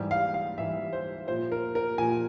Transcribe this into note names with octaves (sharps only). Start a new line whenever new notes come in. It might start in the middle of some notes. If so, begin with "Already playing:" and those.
Already playing: G#2 E3 G3
F5
F5
G#2 E3 G3 E5
C5
A#2 F3 C5
A#4
A#4
A#2 F3 G#5